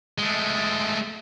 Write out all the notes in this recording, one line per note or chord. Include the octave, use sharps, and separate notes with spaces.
G#3 A3